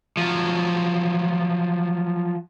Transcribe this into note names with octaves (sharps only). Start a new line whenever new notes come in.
F3 F#3